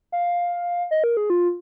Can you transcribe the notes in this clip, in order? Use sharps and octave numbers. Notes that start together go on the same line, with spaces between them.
F5
D#5
A#4
G#4
F4